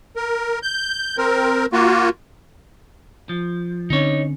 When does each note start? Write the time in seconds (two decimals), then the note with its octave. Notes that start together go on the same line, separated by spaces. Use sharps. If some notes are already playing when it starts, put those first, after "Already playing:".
0.16 A#4
0.63 G6
1.17 C4 A#4
1.73 A#3 F4 F#4
3.29 F3
3.90 D3 C4 C#4 D#4 C#5